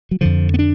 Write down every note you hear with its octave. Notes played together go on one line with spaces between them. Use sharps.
F#3
F2 D3 F3
B3
D4